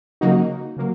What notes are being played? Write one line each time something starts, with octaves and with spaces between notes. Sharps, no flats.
C#3 F#3 A#3 D#4 F#4
C#3 F#3 A#3